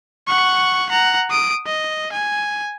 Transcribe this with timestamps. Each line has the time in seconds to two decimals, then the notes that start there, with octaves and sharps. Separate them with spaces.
0.27 F#5 C#6
0.89 F#5 A#5
1.30 D#6 D7
1.66 D#5
2.12 G#5